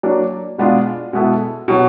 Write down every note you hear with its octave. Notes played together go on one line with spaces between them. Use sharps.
F#3 A#3 D4
B2 G#3 B3 D4 F4
B2 G#3 B3 E4 A4
B2 F#3 B3